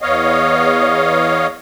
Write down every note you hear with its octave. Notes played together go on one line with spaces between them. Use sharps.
E2 B3 C#5 D#5 F5